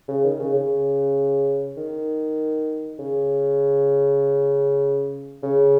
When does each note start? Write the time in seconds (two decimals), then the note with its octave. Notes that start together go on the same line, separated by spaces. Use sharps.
0.09 C#3
0.24 D#3
0.40 C#3
0.54 C#3
1.77 D#3
2.99 C#3
5.43 C#3